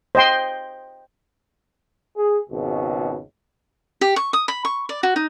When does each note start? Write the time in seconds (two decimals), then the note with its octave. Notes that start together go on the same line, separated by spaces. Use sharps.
0.15 C5 D#5 G5 C6
2.17 G#4
2.50 G#1 C#2 B2
4.01 G4
4.16 C#6
4.33 D#6
4.48 B5
4.65 C#6
4.89 D5
5.03 F#4
5.16 D#4